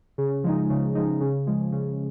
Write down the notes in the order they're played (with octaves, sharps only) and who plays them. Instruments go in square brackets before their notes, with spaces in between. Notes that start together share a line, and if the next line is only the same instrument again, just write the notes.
[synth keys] C#3
F3 G#3 D#4
C#3
F3 G#3 D#4
C#3
F3 G#3
C#3